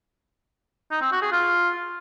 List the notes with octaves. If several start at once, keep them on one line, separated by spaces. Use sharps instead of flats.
D#4
C4
F#4
G#4
F4